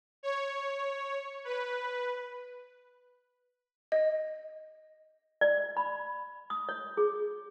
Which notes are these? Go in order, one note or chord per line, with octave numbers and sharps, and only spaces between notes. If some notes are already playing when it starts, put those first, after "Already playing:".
C#5
B4
D#5
D5
B5
D#6
C#5
G#4